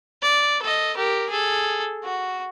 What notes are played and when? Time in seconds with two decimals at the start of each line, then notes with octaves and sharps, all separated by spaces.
0.22 D5
0.62 A4 D#5
0.96 G4 A#4
1.29 G#4 A4
2.03 F#4